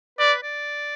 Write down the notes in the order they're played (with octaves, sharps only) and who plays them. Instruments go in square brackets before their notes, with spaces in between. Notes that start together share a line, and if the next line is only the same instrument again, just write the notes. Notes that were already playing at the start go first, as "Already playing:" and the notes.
[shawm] B4 [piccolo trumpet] D5
[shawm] D5